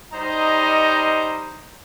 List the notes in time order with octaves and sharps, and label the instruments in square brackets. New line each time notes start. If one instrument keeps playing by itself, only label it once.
[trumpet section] G3 D#4 C5 D#5 A#5